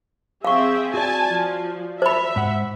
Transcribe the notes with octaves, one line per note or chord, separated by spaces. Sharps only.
C4 G#4 E5 F5 C#6
F#4 D5 G#5 A5
F3
C5 E5 B5
G#2 F#5